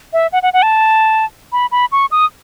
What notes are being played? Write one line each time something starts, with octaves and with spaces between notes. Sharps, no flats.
E5
F#5
F#5
F#5
A5
B5
B5
C#6
D#6